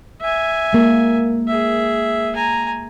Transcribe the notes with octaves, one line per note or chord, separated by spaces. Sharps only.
E5 G#5
G#3 A#3
G#4 E5
G#5 A#5